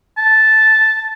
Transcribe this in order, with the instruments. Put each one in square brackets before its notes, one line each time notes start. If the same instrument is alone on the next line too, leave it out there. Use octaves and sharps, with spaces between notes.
[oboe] A5